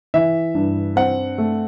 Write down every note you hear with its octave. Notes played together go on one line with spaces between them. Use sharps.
E3 E5
G2
C4 F#5
A3